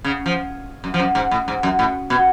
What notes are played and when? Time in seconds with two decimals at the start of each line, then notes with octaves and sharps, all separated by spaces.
0.04 C#3
0.26 F3
0.84 F#2
0.94 F3
1.00 F#2
1.15 G#2
1.31 A2
1.48 G#2
1.63 F#2
1.79 A2
2.10 B2